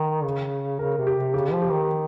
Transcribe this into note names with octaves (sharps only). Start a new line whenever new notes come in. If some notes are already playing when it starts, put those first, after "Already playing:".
Already playing: D#3
C#3
C#3 A#4
C3
G4
C3
C#3 G4
F3
G4
D#3